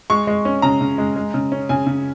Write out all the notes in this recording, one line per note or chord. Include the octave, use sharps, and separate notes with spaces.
G#3 C#6
G#3
C#4
C#3 A#5
C#3
G#3
G#3
C#3
C#4
C#3 G#5
C#3